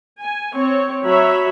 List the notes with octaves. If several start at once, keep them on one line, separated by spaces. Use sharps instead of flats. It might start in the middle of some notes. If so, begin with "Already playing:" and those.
G#5
C4 C#5
F#3 C#5 E5 B5